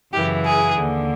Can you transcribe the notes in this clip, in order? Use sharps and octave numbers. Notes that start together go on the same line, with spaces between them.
F#2 C#3 E3 G4
G#4
D#2 D3